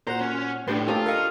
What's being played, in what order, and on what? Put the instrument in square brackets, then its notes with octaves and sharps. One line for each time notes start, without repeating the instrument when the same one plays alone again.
[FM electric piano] A#2 F#4 F#5 [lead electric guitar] C5 [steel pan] A#5
[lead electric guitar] C#4
[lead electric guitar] A2 [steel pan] D4 G4 B4 [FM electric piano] C6
[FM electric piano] A#3 C4 C#4 [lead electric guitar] F4 [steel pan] G4 A4 D#6
[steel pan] A#4 F5 [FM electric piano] D#5 C#6 D#6